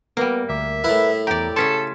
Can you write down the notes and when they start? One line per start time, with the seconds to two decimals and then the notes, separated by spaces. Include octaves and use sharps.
0.17 G3 A#3 B3 B4
0.49 D2 A#4 E5 D6
0.84 A2 E4 A#4 B4
1.27 E2 G4 D5 A#5
1.56 C#3 C#4 A4 A5 C6 G#6 B6